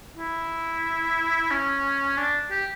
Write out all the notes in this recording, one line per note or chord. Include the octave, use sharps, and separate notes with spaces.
E4
C#4
D4
G4